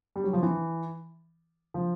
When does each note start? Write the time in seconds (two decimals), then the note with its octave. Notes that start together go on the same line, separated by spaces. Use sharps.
0.16 G3
0.24 F#3
0.33 F3
0.43 E3
1.74 F3